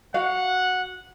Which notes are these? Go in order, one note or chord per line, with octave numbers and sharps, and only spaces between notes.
F#4 F5 F#5